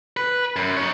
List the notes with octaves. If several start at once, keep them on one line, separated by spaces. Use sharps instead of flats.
B4
F#2
D#4 C#5